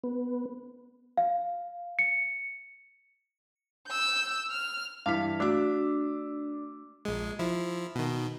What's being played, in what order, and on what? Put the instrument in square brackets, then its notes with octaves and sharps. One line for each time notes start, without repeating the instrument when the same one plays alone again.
[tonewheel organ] B3
[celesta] F5
C#7
[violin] E6 G6
F6
[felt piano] G2 E3 B6 [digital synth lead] F5 [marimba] D6
[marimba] A3 F#4 [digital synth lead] D4 [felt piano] D6 E6
[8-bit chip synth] A#1 G#3
F3 E4
B2 D#3